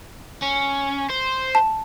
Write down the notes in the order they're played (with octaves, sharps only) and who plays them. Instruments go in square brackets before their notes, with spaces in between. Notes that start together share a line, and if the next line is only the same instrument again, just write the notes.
[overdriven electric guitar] C#4
C5
[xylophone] A5